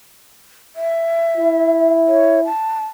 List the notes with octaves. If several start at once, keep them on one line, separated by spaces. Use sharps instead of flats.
E5
E4
C#5
A5